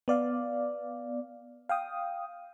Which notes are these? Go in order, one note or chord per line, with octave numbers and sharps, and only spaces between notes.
B3 D5 F5
F5 G5 D#6